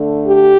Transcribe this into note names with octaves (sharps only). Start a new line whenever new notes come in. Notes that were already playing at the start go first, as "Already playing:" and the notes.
Already playing: D3 A3 D4
G4